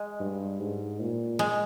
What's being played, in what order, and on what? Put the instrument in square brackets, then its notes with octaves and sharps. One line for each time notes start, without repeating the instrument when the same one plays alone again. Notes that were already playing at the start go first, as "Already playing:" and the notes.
Already playing: [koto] G#3
[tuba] G2
G#2
A#2
[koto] G#3